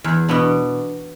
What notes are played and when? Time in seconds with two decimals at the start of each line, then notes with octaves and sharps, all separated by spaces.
0.04 E2
0.28 B2 B3 D4